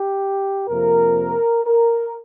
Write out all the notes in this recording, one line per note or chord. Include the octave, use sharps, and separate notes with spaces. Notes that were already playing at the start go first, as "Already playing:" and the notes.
Already playing: G4
F2 C3 F3 A#3 A#4
A#4